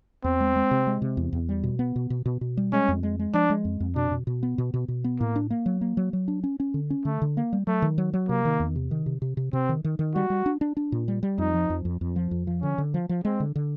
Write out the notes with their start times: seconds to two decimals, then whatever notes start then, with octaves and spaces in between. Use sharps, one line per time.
0.24 E2 C4
0.40 G#3
0.56 G#3
0.71 C3
0.87 G#3
1.02 C3
1.17 E2
1.33 E2
1.49 G3
1.63 B2
1.79 B3
1.96 B2
2.10 B2
2.26 B2
2.41 B2
2.57 G3
2.73 G#3 C#4
2.88 F2
3.03 G#3
3.19 G#3
3.34 F3 D4
3.50 G#3
3.65 F2
3.80 F2
3.96 B2 D4
4.12 B2
4.27 B2
4.43 B3
4.58 B2
4.74 B2
4.88 B2
5.04 B3
5.19 A2 A#3
5.36 D4
5.50 A#3
5.66 F#3
5.81 A#3
5.97 F#3
6.13 F#3
6.28 D4
6.44 C#4
6.60 C#4
6.74 D3
6.90 C#4
7.05 D3 A3
7.22 D3
7.37 A#3
7.53 G3
7.67 F#3 A3
7.82 D#3
7.98 F#3
8.14 F#3
8.29 C3 A#3
8.45 D#3
8.60 E2
8.76 C3
8.91 D#3
9.06 C3
9.22 C3
9.37 C3
9.53 C3 C4
9.69 D#3
9.84 D#3
9.99 D#3
10.15 G3 F#4
10.30 G3
10.46 D4
10.61 D4
10.77 D4
10.92 A#2
11.08 G3
11.23 G3
11.38 F2 D#4
11.54 F3
11.70 F2
11.85 F2
12.01 F2
12.16 F3
12.31 F2
12.47 F3
12.62 D3 C#4
12.78 D3
12.94 F3
13.09 F3
13.24 G#3 C4
13.40 D3
13.55 D3